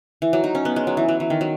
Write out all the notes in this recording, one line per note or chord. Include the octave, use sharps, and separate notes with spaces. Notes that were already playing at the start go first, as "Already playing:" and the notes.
E3
F#3
D#4
C#4
B3
G#3
F#3
E3
F#3
E3
D#3
F#3